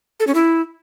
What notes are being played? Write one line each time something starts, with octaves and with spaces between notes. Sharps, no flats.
A4
C#4
E4